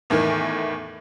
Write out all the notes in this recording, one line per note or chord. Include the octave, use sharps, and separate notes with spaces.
E2 A2 D#3 E3